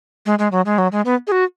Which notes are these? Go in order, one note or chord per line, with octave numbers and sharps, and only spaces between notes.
G#3
G#3
F#3
G#3
F#3
G#3
B3
G#4
F#4